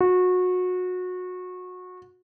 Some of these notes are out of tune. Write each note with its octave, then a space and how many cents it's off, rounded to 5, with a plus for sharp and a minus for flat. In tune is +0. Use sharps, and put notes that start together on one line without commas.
F#4 -25